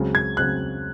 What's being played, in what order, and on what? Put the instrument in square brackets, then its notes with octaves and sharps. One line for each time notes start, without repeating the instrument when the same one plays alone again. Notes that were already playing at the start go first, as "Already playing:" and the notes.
Already playing: [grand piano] C#2 C#3 F#3 C4
[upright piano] G#6
[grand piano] C#3 F#3 C4 [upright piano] F#6